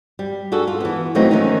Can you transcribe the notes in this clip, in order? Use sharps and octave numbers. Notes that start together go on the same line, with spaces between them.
G3
D4 F#4 G#4 A4
F4
E3 B3
E3 F#3 A3 A#3 C4 D#4
D#3 E3 A3 C#4 D#4